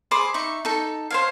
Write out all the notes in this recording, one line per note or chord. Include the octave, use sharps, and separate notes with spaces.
G#4 C5 B5 D6
D#4 E5 C#6
D#4 A4
C5 C#5 F5